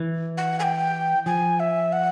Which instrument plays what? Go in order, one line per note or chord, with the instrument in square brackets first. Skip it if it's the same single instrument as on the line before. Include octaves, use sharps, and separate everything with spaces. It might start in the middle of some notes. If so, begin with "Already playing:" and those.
Already playing: [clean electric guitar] E3
[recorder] F#5
G#5
G5
[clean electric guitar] F3 [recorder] G#5
[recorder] E5
F#5